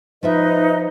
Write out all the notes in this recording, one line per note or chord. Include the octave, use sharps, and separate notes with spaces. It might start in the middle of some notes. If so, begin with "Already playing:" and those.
F3 D#4 F4 B4 D#5 E5